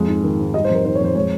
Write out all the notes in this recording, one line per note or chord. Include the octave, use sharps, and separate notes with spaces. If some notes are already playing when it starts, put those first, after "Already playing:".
Already playing: F2 G#3
G#2
D#3
G#2
G3 D#5
C5
F2
A#4
D#3 C5
C#5
F2 C5
G#3 C#5